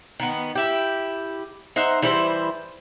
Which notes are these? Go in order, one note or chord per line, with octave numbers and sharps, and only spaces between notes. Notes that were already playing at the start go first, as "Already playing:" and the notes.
D#3 B3
E4 G4
D#4 C5 E5 F#5
E3 G3 E4 C5